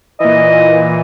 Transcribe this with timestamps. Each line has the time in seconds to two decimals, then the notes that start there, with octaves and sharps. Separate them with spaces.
0.20 A#2 E3 D#5